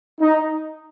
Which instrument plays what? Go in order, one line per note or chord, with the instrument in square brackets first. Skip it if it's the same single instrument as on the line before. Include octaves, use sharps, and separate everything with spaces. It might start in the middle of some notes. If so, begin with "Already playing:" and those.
[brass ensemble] D#4